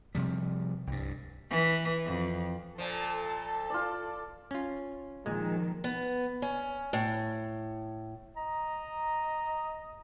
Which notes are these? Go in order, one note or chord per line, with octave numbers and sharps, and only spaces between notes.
C3 F3 G3
C2 G2
E3
F2
A#2 F3 A4
F4 D5
C#4 F4
A#2 D#3 F3 G#3
B3
C#4
A2
D#5 A#5